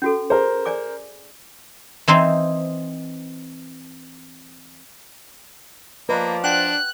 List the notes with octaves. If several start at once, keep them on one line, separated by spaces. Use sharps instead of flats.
C#4 F#4 A4
G#4 A#4 C5
D5 G#5 D6
E3 C4 D#4 C5
F3 A#3 B4 D5 D#5 A5
D4 F#5 G5 F#6